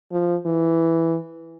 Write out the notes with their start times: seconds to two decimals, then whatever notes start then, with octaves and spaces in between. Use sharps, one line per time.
0.12 F3
0.46 E3